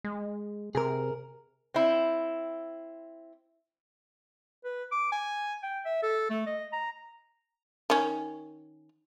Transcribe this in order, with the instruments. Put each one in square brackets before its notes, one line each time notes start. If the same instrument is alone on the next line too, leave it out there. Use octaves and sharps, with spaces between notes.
[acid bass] G#3
[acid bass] C3 [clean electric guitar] G#4 A#4
[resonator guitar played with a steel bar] C4 E4
[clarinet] B4
D6
G#5
G5
E5
A4
A3
D#5
A#5
[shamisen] D#3 C#4